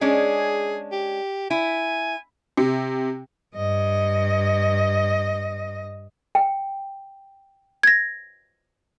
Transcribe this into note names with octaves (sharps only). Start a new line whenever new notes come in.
G#3 C#4 D4 G#4
G4
E4 G#5
C3
G2 D#5
G5
G#6 A#6